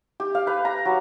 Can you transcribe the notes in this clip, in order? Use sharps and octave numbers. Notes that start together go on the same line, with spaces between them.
G4
F5
B4
A#5
F#3